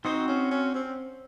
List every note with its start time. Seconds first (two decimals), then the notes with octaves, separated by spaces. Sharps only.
0.05 C4 D#4 F#4 C5
0.28 C#4
0.51 C#4
0.74 C4